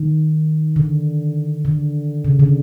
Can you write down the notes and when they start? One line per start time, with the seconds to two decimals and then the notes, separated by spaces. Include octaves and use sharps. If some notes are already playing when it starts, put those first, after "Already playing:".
Already playing: D#3
0.76 D3
1.65 D3
2.25 C#3
2.39 D3